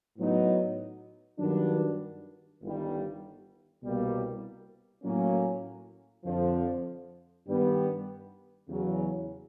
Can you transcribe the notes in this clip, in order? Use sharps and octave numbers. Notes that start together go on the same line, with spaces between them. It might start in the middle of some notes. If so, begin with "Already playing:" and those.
A2 F#3 B3 D#4
G2 D#3 F#3 B3 D4
G1 G2 D#3 G3
C2 B2 G3 A#3
A2 F#3 A#3 C#4
F2 D3 F3
G2 D#3 G3 B3
E2 C#3 F#3